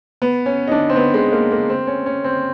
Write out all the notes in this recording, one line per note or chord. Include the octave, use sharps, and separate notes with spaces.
B3
C#4
D#4
D4
C4
B3
G#3
A#3
A#3
C4
C#4
C#4
C4